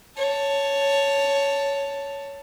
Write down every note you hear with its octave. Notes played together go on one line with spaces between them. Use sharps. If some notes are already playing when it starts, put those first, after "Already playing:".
C#5 A5